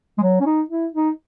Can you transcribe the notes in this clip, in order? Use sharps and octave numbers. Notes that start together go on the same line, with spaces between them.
G#3
F#3
C#4
D#4
E4
D#4